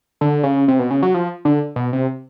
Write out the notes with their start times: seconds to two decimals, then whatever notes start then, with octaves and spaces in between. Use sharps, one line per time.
0.21 D3
0.43 C#3
0.68 C3
0.79 B2
0.91 C#3
1.03 F#3
1.14 F3
1.45 D3
1.76 B2
1.93 C3